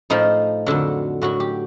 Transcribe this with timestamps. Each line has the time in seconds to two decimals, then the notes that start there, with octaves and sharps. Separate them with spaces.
0.10 A2 F3 D#4
0.66 F2 D3 F#3
1.21 A2 F#3 F#4
1.40 G4